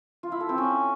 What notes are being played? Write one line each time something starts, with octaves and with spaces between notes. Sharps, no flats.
F4
E4
A4
C4
C#4